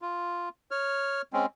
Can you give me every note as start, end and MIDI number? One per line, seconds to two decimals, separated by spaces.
0.02 0.49 65
0.71 1.22 73
0.71 1.22 89
1.33 1.46 56
1.33 1.46 60
1.33 1.46 61